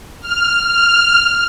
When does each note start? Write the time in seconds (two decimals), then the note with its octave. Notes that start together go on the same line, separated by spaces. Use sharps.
0.20 F6
0.63 F6